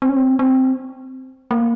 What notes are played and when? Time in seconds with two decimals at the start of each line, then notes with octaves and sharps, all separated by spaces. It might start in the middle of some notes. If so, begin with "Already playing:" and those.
0.02 C4
0.09 C#4
0.16 C4
0.39 C4
1.51 A#3